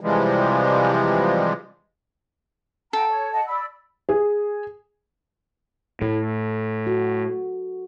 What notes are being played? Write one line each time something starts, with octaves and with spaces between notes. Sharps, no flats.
C3 E3 F3 G3 G#3
A4 F#5 G5 A#5
C#5
D#5 F#5 A5
D5 B5 E6
G#4
A2 A4
F#4